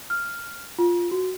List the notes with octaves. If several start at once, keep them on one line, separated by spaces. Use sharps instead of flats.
F6
F4
F#4